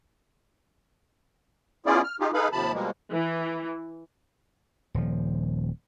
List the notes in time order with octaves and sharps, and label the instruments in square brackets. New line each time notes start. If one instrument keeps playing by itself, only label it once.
[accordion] B3 C#4 E4 F4 G#4 D5
F6
D#4 F4 G4 G#4
D#4 G#4 A4 B4 F5 B5
D#2 C3 F3 A5 B5
B2 F3 G3 G#3 A#3
[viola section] E3
[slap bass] D#1 F3